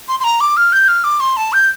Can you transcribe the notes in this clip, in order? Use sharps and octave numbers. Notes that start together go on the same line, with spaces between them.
C6
C6
A#5
D6
F6
G6
F6
D6
C6
A5
G6